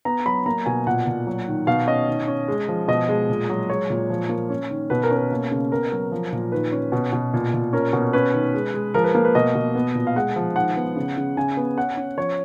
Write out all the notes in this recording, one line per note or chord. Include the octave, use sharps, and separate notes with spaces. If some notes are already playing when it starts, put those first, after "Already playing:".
B3 A#5
F#3 B5
A#3 A#5
B2 G#5
A#2 F#5
A#2
F#3
D#3
B2 F5
C#4 D#5
D#3
C#4
G#3
F3
B2 D#5
G#3
A#2
F#3
G#3 C#5
A#2
F3
A#3
C#4
D#3
B2 B4
A#4
C#4
A#4
A#3
C#3
B3 A#4
F#3
F3
A#2
D#3 B4
C#4
B2
B2
A#2
A#2
C#4 A#4
B2
C#4 B4
D#3
G#3
G#3
F3 A#4
B4
A#3
B4
B2 D#5
B2
B3
A#2
F5
G#3 F#5
F3
D#3 F#5
B3
C#3
C#3
C#3 G#5
B3
C#4 F#5
C#4
F3 C#5